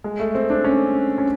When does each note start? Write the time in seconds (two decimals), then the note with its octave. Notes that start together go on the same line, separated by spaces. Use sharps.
0.04 G#3
0.20 A3
0.35 C4
0.50 D4
0.64 C#4
1.18 C#4